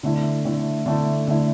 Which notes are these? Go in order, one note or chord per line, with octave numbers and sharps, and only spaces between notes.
D3 A3 E4
D3 A3 E4
D3 A3 E4
D3 A3 E4